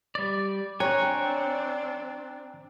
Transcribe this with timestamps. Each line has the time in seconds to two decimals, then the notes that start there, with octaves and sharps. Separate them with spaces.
0.15 G3 D5
0.80 C4 D4 C#5 G5 G#5 A#5 C#6 F#6